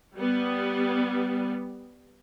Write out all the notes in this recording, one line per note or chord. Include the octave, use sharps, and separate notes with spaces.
G3 B3